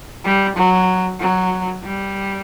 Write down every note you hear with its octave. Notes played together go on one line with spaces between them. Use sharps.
G3
F#3
F#3
G3